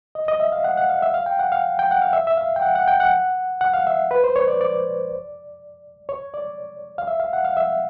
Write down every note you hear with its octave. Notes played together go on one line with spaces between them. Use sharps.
D#5
D#5
E5
F5
F#5
F#5
F5
E5
F5
G5
F#5
F5
G5
F#5
F5
E5
E5
F5
G5
F#5
F#5
G5
F#5
F#5
F5
E5
B4
C5
C#5
D5
D5
C#5
D5
F5
E5
F5
F#5
F5
E5